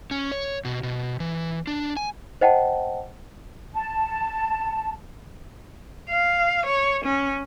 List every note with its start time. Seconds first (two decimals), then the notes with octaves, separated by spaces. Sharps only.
0.11 C#4
0.32 C#5
0.65 B2
0.83 B2
1.20 E3
1.67 D4
1.97 G#5
2.41 C5 D#5 F#5 G5 A5
3.74 A5
6.10 F5
6.66 C#5
7.05 C#4